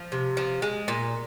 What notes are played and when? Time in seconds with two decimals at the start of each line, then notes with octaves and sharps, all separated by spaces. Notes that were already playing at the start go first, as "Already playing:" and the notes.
Already playing: F3
0.12 C3
0.37 F3
0.62 G#3
0.88 A#2